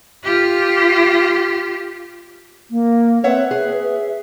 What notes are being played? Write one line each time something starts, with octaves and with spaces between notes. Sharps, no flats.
F4 G4
A#3
C4 B4 C#5 E5 F#5
G#4 E5